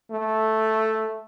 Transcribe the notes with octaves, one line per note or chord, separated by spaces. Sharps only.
A3